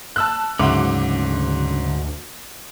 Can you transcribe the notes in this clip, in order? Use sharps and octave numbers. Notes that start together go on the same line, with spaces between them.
A5 E6 F#6
D2 G#2 C#3 F#3 E5 F#5 D6